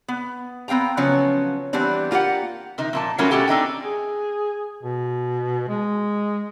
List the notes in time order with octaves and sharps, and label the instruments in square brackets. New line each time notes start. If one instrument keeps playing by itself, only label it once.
[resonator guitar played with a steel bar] B3
B3 C4 F5 G5 A#5
C#3 F3 F#3 B3 C#4
E3 G3 B3 C4 D4
A#3 F4 G4 C5 F#5
C3 D#3 D#4
F2 A#2 A5
F#3 G3 A3 A#3 C#4 F4
B2 A3 C#4 F#4 G4 A4
C4 D4 D#4 G5
[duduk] G#4
B2
G#3